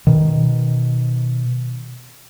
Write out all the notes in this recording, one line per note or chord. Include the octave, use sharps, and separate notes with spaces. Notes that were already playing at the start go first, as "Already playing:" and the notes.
B2 D#3